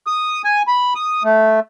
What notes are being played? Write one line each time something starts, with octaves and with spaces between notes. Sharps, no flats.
D#6
G#5
B5
D#6
A3